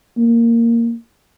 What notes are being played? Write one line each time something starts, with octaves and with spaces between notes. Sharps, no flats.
A#3